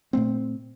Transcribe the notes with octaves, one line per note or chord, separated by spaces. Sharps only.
A#2 A3 C4